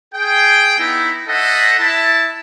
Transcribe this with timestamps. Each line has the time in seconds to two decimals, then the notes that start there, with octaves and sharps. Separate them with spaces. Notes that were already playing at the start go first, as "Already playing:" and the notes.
0.14 G#4 G5
0.79 B3 D#4 E4
1.28 A4 C5 D#5 E5 F#5
1.80 E4 E5 A5